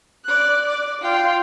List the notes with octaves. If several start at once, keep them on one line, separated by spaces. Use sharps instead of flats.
D5 F#6
D5
F4 G5